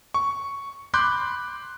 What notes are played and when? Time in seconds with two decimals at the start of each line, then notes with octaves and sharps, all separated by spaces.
0.14 C#6
0.94 B5 C6 D6 F#6 G6